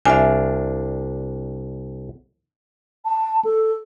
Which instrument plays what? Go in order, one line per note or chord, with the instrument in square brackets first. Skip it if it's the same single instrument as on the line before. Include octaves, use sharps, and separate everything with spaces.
[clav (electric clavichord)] C2 D4 F5 [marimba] E5 G#5
[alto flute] A5
A4